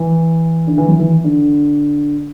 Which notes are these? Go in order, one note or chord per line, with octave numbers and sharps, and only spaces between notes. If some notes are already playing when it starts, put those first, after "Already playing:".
Already playing: E3
D3
E3
F#3
E3
D3